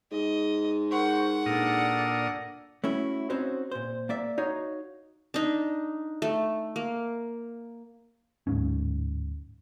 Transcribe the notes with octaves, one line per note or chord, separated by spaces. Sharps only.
G#2 D#5
A#4 C5 F#5 C#6
A#2 D4 A4 A#4 D5 D#6
A3 C#4 E4 F#4
C4 C#4 D#4 F#4 C5
A#2 C5
A#3 D5 E5
D#4 F#4 C#5 D#5 F5
D4 D#4
A3
A#3
D1 G#1 G#2 C#4